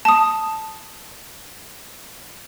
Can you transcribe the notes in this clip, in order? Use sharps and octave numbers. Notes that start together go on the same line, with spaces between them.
A5 D#6